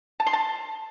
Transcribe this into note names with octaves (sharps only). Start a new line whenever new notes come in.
A5
C6
A5